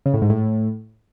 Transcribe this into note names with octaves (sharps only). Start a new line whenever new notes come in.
C#3
A2
G#2
A2